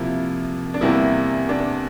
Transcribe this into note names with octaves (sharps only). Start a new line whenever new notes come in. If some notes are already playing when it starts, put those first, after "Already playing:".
Already playing: C3 F3 A#3 E4
D4
E2 C3 G3 A#3 E4
D4